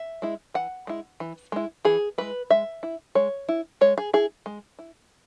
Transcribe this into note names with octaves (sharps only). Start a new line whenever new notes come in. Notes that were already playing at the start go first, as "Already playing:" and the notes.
Already playing: E5
G#3 E4
E3 F#5
G#3 E4
E3
G#3 E4
E3 G#4
G#3 E4 B4
G#3 E5
E4
G#3 C#5
E4
G#3 C#5
G#4
E4 G#4
G#3
E4